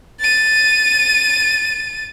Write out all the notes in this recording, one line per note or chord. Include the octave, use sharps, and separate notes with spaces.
A6 D#7